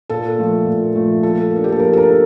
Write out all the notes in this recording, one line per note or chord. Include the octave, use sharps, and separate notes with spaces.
A#2 A4
F3 A3
A#2
F3 A3
F3 A4
A#3 D4
G4
A4
F3 A#4
A4
A#4
A#3